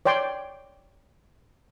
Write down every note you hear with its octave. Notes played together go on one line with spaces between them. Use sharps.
C#5 D5 G5 C6